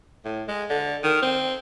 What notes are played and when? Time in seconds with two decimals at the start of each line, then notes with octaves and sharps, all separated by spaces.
0.25 A2
0.48 G#3
0.70 D3
1.03 D#3
1.22 C4